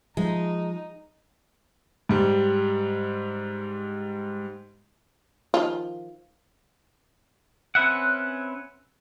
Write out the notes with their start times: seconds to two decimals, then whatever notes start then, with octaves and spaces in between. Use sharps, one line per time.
0.17 F3 G#3 D#4
2.09 G#2 G3
5.54 D#3 F3 F4
7.75 C4 C#4 B4 E5 F#5